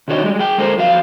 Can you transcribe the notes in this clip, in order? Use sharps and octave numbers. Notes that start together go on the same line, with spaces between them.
C3 D#3 D4 F#4 C#5 D#5
G3 G#3
G#4 G5
G#3 A4 A#4 C5
F2 F#3 E4 F5